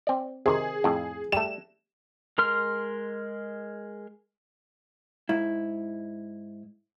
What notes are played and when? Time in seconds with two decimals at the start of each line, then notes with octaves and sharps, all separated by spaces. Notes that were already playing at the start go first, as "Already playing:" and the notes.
0.07 C4 D5
0.46 C3 D#3 G#4
0.84 F2 A2
1.32 G3 A3 E7
2.38 G#3 A#4 C6 F6
5.29 G#2 E4